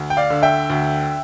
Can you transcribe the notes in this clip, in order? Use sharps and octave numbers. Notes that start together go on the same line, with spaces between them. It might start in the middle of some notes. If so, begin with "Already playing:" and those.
Already playing: D2
G5
D5 F5
D3
E5 G5
D2